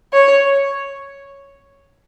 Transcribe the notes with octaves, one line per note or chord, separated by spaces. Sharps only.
C#5